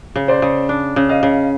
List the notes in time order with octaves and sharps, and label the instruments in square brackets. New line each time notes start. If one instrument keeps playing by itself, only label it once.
[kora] C#3
[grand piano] C5 D5
[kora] C#3
D4
C#3
[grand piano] D#5 F5
[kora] C#3